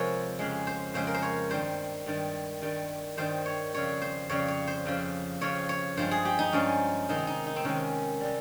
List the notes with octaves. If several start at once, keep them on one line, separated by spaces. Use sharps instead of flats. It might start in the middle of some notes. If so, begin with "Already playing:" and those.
Already playing: C3 F3 G#3 A#4 C#5
F2 C#3 G#3
C5
F2 C#3 G#3 C5
A#4
C5
C#5
G2 D#3 G3 C5
G2 D#3 G3
G2 D#3 G3
G2 D#3 G3 C5
C#5
F2 C#3 G3 C#5
C5
F2 C#3 G3 C#5
C#5
C5
F2 C#3 F3
F2 C#3 F3 C#5
C#5
G2 F3 G#3 C5
G#4
G4
D#4
G2 F3 G#3 C#4
C3 D#3 G#3 D#4
D#4
D#4
C4
C3 D#3 G#3 C#4
C3 G3